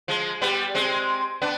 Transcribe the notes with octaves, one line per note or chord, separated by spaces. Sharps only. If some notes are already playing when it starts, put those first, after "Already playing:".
F3 G#3
G3 B3
G#3 C4
B3 D4